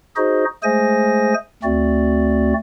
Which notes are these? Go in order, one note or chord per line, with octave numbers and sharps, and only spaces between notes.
D#4 F#4 G#4 C5 D#5
G#3 A3 G#4 C5 G#5 A#6
D2 A3 C4 F#4 D5